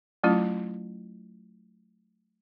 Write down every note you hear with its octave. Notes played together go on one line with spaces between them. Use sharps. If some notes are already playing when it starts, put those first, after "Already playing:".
F#3 A3 C#4 E4 F4